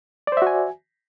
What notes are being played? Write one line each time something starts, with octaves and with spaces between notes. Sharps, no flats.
F#4 C5 D5 E5 G#5